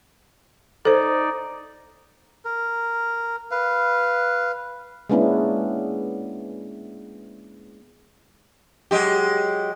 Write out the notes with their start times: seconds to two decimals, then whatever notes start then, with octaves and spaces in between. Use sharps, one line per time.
0.85 D#4 A4 C5 D5
2.45 A#4
3.51 B4 F5
5.10 G#3 A#3 B3 C#4 D4 E4
8.91 F#3 G#3 G4